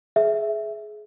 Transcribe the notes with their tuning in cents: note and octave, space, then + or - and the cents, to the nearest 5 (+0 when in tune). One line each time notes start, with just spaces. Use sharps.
G#4 +25 E5 +0